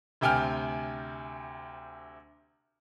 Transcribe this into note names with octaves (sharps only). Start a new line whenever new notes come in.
D2 C3 G5 G#5 F6